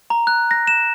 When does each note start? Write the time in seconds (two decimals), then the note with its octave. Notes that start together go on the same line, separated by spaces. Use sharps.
0.10 A#5
0.27 F#6
0.51 A#6
0.67 E7